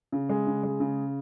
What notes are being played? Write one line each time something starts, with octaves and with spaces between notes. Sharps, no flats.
C#3
G#3
C#3
G#3
C#3